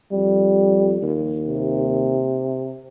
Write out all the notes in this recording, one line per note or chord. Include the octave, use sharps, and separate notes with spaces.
F2 G3
D#2
C3